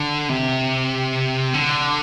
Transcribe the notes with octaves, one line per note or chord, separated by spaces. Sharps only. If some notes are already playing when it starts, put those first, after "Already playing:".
Already playing: D3
C3
D3